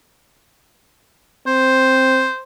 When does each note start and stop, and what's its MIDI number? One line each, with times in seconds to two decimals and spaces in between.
1.47 2.27 60
1.47 2.42 72